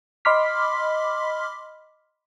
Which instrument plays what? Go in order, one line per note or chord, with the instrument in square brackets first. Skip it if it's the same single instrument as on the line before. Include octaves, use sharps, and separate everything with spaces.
[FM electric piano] D#5 B5 C6 D6 F6 B6